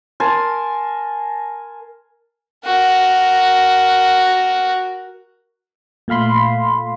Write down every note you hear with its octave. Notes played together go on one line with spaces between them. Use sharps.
A#4 G#5 A5 C6
F#4 A#4
A#2 A3 F5 B5 C6